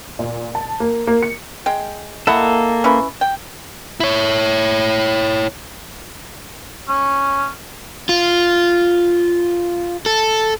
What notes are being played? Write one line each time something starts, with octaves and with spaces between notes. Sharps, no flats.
A#2
A5
A#3
A#3
C#7
G#3 G5
A#3 E4 A4 D#5 F#5
C#4 E4 B4
G5
E4 C#5
C#4
F4
A4